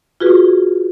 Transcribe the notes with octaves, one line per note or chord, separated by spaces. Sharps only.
F4 F#4 G#4 B4